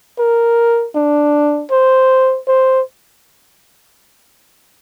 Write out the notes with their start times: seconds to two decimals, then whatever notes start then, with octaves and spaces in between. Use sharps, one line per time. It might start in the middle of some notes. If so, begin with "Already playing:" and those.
0.19 A#4
0.95 D4
1.71 C5
2.48 C5